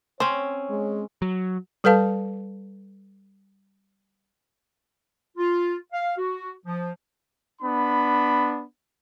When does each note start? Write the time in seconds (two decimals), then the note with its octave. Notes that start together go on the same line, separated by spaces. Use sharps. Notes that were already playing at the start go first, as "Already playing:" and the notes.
0.20 C4 C#4 C5 C#5
0.70 G#3
1.22 F#3
1.84 G3 A4 B4 F5 A5
5.37 F4
5.92 F5
6.17 F#4
6.65 F3
7.62 B3 D4 B5